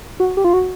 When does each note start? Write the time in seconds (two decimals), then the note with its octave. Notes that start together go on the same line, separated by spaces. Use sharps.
0.20 F#4
0.37 G4
0.44 F4
0.53 F#4